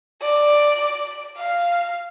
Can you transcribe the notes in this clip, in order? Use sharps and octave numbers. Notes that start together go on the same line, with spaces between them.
D5
F5